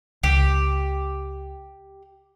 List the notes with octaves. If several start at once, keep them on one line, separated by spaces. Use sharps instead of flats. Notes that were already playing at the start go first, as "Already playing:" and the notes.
C#2 G4